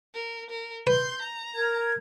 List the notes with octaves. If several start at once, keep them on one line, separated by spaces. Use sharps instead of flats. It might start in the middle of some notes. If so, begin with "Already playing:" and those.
A#4
A#4
B4 C6 G6
A#5
A#4 G#6